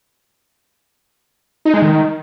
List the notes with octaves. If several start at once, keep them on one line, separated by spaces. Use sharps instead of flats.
D#4
G#3
D#3